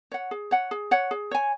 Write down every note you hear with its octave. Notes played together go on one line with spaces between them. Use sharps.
C#5 F#5
G#4
C#5 F#5
G#4
C#5 F#5
G#4
C#5 G#5